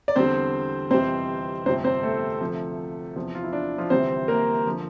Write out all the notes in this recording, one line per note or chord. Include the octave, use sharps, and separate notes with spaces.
D5
E2 D3 G3 C4 C5
F1 F2 E3 G3 C4 C5
G1 F2 C3 G3 C4 C5
C4 C5
A3 A4
D2 C3 F3
E2 C3 F3
F4
E4
D4
F3 F4
D2 C3 E3 G3 C4 C5
A#3 A#4
D3 F3